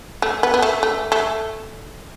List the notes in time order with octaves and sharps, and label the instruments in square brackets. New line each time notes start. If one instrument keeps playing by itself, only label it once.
[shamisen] A3
B3
B3
A3
A3
A3